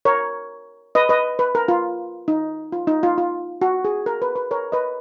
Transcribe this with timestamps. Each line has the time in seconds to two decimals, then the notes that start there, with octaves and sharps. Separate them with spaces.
0.05 A#4 C#5
0.95 B4 D#5
1.09 B4 D#5
1.39 B4
1.55 A#4
1.68 F4
2.28 D#4
2.72 F4
2.87 D#4
3.03 F4
3.18 F4
3.62 F#4
3.85 G#4
4.06 A#4
4.22 B4
4.36 B4
4.51 A#4 C#5
4.72 B4 D#5